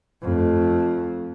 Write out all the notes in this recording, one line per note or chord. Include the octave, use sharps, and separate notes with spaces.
F2 A3